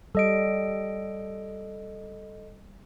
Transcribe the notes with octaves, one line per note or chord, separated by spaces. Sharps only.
G3 A4 D#5 D7